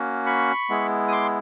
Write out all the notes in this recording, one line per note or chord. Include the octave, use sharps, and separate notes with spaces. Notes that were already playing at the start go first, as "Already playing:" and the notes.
Already playing: A#3 C#4 F#4
B5 C#6
G#3 B3 E4
D#6
C6 D6